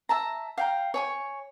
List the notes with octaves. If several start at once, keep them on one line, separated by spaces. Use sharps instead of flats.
E5 A5 A#5
F5 G5 A#5
C#5 G#5 C#6